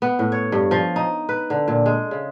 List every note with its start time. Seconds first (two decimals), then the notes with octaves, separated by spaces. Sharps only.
0.02 B3
0.19 A2
0.32 C#5
0.52 G2
0.71 F3
0.96 D#4
1.29 B4
1.50 D3
1.68 A#2
1.86 G#3
2.11 C#3